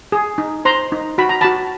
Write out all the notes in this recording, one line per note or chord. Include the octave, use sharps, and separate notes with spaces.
G#4
D#4
C5 A#5 C6
D#4
F#4 B5
A#5
F#4 A5 B5